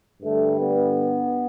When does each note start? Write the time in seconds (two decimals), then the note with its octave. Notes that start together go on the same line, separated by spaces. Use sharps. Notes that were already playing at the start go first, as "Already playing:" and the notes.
0.22 G2 D3 G3 A3
0.60 B3